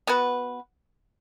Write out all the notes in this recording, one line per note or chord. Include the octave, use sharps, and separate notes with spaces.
B3 F#4 B4